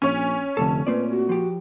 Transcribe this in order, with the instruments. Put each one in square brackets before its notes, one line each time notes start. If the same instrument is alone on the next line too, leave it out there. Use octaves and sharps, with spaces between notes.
[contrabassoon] A#1 [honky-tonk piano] C#4 C#5
[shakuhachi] G#5
[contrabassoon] F1 [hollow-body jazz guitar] D3 A4 [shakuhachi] A5
[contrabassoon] A#2 [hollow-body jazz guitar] A3 C4 D5 [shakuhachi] B4
[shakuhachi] F#4
[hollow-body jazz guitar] F3 G4